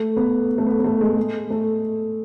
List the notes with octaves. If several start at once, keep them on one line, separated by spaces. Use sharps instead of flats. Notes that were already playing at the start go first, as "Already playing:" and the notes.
Already playing: A3
B3
A3
B3
B3
A3
G#3
G#3
A3